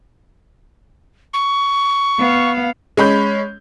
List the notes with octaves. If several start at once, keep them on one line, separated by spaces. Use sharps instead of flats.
C#6
B3 F5
G#3 C#4 B5 G6